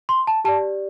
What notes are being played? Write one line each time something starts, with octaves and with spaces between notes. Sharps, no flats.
C6
A5
G4 D5 A5